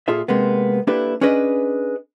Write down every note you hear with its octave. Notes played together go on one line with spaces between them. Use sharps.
A#2 F4 G#4 A4 E5
C3 G#3 A#3 B3
A#3 D4 E4 G4 A4 B4
C#4 D4 G#4 B4 D#5